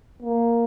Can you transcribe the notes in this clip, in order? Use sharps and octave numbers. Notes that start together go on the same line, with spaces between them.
A#3